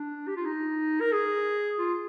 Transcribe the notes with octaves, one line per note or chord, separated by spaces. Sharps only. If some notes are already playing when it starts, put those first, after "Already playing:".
Already playing: D4
G4
F4
D#4
A#4
G#4
F4